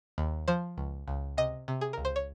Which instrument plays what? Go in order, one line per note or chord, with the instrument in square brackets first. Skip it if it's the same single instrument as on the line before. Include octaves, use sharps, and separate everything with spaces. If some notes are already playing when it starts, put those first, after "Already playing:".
[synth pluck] D#2
F3 C5
C#2
C#2
C3 D#5
C3
G#4
C#2 A#4
C5
C#5